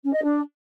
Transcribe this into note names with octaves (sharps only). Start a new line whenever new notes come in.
C#4
D#5
D4